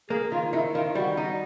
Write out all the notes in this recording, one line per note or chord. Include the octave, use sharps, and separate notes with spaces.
A#3 G#4
D#3 F4
D#3 E4
D#3 F4
G3 F#4
D#4